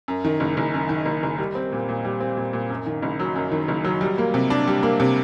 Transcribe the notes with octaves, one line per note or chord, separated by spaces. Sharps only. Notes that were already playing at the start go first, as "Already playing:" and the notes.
F#2
D#3
F#1
F#1
F#2
D#3
F#1
F#1
G3
C4
A#2
A#2
G3
C4
A#2
A#2
F#2
D#3
F#1
F#3
F#2
D#3
F#1
F#3
G3
A#3
C3
D4
G3
A#3
C3